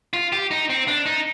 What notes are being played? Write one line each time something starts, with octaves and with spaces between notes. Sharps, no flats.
F4
G4
D#4
C4
D4
D#4